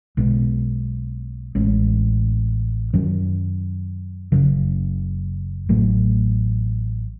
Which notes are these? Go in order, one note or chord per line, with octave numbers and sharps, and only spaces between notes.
B1 B2 G#3 B3
A1 A2 G#3 C#4
F#2 D#3 F#3 C#4
F#1 F#2 C#3 F#3
A1 A2 F#3 A3